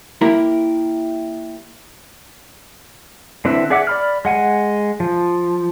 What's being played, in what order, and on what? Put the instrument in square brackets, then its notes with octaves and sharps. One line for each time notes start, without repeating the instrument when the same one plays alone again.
[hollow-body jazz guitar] A#3 E4 G4 A#4
[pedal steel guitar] D3 C4 E4 B4 E5
G#4 D5 E5 F#5 D6
D5 B5 F6
G#3 F#5 G#5
F3